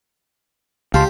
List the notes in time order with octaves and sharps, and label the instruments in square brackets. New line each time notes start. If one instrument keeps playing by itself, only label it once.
[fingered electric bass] C#2 [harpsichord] G4 [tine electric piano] F5 A5 C6